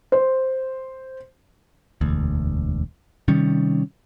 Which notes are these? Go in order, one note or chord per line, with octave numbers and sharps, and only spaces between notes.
C5
E1 D2
C3 D#3 G3 C#4